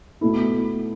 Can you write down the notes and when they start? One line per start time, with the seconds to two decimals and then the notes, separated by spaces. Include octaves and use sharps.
0.21 B2 A3 E4